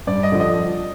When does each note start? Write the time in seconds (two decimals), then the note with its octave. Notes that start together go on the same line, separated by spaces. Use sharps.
0.07 G2 D5
0.23 D#5
0.32 D3 F3
0.40 D#5